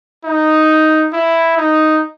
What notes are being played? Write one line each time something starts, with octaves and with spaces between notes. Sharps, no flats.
D#4
E4
D#4